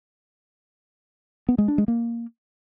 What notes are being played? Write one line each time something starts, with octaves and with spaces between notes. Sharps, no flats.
B3
G#3
D4
G#3
A#3